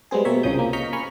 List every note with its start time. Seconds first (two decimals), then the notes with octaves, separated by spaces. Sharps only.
0.11 G3 G#3 B3 C4 G#4
0.25 B2 A#3 C4 C#5 E5
0.43 C2 C#3 F3 D#6 G6
0.59 A#3
0.73 D#5 A#5 C#6 F6 G6 B6
0.93 G#5 B5 C#6 F6